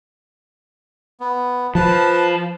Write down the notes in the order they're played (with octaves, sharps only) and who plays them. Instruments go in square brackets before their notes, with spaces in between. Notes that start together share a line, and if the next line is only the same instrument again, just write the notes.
[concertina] B3
[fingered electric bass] F3 [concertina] B4 A5